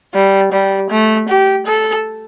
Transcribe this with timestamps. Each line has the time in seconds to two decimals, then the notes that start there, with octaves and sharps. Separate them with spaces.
0.14 G3
0.52 G3
0.90 A3
1.28 G4
1.67 A4